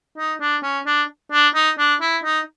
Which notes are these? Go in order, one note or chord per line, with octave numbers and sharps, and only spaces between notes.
D#4
D4
C#4
D4
D4
D#4
D4
E4
D#4